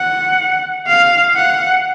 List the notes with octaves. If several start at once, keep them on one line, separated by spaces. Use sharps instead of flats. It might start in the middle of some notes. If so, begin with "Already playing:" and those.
Already playing: F#5
F5
F#5